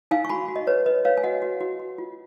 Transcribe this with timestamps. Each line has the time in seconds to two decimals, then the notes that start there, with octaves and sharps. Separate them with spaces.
0.11 D#4 F5 G#5
0.25 C#6
0.29 F#4 G#5 B5
0.48 F#4
0.56 D#5
0.67 B4 C#5
0.86 B4 D#5
1.05 B4 C#5 F5
1.17 G#5
1.23 F#4 D#5 F#5
1.42 F#4
1.61 F#4
1.80 F#4
1.98 F4